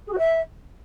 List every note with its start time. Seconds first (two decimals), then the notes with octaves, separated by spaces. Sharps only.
0.06 G#4
0.12 F#4
0.18 E5